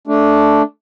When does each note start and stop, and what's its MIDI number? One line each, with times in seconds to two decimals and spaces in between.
0.07 0.62 57
0.07 0.62 62